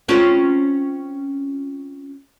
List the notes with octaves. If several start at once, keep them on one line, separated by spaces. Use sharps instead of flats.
C4 C#4 F4